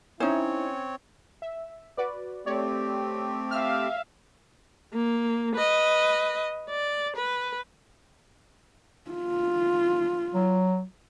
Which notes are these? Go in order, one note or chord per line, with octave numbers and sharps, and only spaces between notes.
C4 C#4 D#4 E4 C5 C#5
E5
F#4 B4 D5
A3 C4 G4 C#5 D5
E5 F5 F6
A#3
B4 D#5
D5
B4
F4
F#3